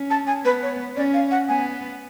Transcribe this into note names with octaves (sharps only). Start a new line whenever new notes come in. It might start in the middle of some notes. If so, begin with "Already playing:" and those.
Already playing: C#4
A5
G#5
B3 B4
C#5
C#4 D5
F5
F#5
B3 G#5